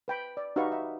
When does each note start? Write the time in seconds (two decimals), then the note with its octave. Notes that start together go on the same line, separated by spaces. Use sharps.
0.08 B4 G5 B5
0.37 D5
0.56 D#4 F#4 G4 B4 F5 C#6
0.72 E5